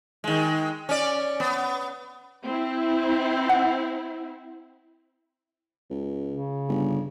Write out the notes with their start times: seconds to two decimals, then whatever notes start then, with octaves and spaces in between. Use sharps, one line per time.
0.24 D#3 G#3
0.89 C#4 D5
1.40 B3
2.44 C4 E4
3.49 F#5
5.90 C#2
6.30 C#3
6.68 G1